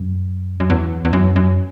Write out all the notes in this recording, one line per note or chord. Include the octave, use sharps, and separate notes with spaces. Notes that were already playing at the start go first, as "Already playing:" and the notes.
Already playing: F#2
F#2
E2
E2
F#2
F#2